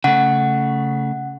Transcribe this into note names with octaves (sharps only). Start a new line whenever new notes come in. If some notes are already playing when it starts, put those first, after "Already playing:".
C#3 A3 F#5